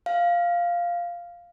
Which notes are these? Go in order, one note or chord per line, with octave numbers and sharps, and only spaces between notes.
F5